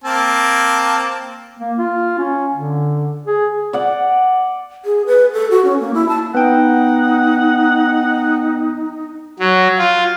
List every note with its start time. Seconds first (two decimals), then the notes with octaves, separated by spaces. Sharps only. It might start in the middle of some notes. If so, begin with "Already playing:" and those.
0.04 A#3 C4 A5
1.59 A#3
1.78 F4
2.19 C#4
2.54 D3
3.27 G#4
3.73 D5 F#5
4.85 G#4
5.07 B4
5.33 A4
5.51 F#4
5.65 C#4
5.80 A#3
5.94 E4
6.09 A5
6.34 B3 D#4 F#5 G5
9.39 F#3
9.79 F4